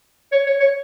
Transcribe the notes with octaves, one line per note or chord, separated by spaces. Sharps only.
C#5
C#5
C#5